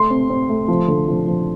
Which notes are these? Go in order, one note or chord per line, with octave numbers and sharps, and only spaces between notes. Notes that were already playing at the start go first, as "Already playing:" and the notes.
Already playing: A3 C6
C4
C4
A3
F3
D3
F3
F3